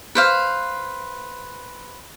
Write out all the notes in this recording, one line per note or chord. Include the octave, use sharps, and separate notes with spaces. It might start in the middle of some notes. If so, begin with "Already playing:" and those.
B4 C5 F5